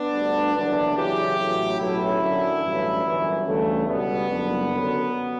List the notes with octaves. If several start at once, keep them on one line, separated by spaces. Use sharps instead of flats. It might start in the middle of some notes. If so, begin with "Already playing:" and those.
Already playing: B3 D4
D2 D3 G3
F#1 E2 D3 F#3 B3 D4
E2 C#3 F#3 E4 G4
A1 A2 F#3
B1 A2 F#3 C#4 E4
F#2 D3 F#3
A1 G2 F#3
G1 F#2 E3
D2 C#3 E3 G3 A3 C#4
C#2 B2 G3 B3
F#1 F#2 D3 G3
F#2 D3 F#3